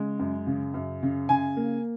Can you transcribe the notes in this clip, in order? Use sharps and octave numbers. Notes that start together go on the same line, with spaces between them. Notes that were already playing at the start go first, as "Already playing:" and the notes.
Already playing: C#3 G#3
F#2
C#3
F#2
C#3
C#3 G#5
A#3